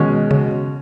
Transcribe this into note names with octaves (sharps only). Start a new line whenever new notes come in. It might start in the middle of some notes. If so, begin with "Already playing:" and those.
Already playing: B2 D#3 G#3 C#4 F#4
C#3